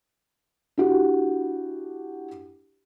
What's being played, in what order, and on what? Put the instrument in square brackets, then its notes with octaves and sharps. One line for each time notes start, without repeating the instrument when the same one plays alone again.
[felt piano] D4 E4 F#4 G4